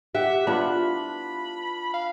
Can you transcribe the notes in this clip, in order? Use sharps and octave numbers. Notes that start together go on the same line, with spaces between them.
G4 E5 F#5
B3 D4 E4 F4 B5
F5